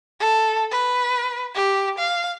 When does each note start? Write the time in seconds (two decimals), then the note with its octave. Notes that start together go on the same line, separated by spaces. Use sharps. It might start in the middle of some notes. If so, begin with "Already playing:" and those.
0.20 A4
0.71 B4
1.55 G4
1.98 F5